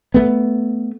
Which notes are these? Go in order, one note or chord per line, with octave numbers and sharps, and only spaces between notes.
A3 B3